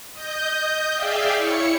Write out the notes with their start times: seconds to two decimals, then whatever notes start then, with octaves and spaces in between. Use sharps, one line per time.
0.13 D#5 G6
0.94 G#4 D5 E5 F5 G5
1.37 E4 C#5 C#7